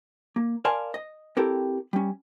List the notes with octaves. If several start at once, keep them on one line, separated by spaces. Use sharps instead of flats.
A#3
A#4 D5 F5 G#5 A5 C6
D#5
C4 E4 G4 A4 A#4
G3 C#4